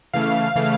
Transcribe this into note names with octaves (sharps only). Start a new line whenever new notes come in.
C#3 E3 A3 F5
C#3 E3 A3